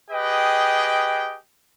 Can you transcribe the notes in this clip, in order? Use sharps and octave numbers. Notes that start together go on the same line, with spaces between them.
G4 G#4 B4 D#5 G5